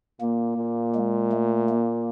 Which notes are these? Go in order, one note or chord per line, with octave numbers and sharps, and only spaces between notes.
A#2 A#3
A#2
G#3
A3
A#3